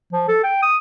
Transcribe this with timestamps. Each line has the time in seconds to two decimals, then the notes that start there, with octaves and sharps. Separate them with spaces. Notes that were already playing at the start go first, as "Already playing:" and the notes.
0.13 F3
0.28 A4
0.43 G5
0.62 D#6